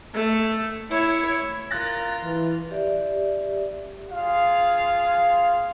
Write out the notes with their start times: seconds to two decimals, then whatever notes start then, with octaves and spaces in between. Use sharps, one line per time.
0.14 A3
0.90 E4 C#5
1.71 F4 A#4 F#6 A6 A#6
2.23 E3
2.71 G4 D5 E5
4.12 F4 G#4 F5